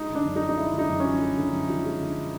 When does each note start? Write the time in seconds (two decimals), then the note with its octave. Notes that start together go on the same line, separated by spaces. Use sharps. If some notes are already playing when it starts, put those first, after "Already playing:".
Already playing: G#3 D#4
0.10 D3
0.15 D4
0.25 F#2
0.36 D#4
0.41 F3
0.49 D#4
0.57 G#3 E4
0.73 D3
0.78 D#4
0.89 F#2
1.00 C#4
1.05 F3
1.20 G#3
1.36 D3
1.53 F#2
1.69 F3
1.84 G#3
2.01 D3